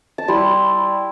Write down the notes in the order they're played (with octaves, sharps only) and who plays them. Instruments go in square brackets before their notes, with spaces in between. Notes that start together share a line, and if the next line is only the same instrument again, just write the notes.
[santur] A5
G3 E4 C6